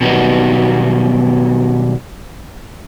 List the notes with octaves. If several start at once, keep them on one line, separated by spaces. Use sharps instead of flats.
B2 D#3 F#3 G3 B3 D#4